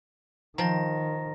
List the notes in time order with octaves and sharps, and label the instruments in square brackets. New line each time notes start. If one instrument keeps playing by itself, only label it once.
[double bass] D#3 [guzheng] F3 G5 [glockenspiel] A#5 A#6